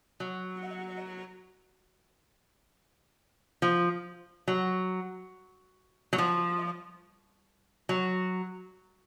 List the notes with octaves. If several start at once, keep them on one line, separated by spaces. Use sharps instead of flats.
F#3
F3
F#3
F#3
F3
F#3